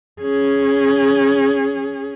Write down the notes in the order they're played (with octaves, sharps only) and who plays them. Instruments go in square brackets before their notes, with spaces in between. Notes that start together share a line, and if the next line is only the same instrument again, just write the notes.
[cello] C#4 G#4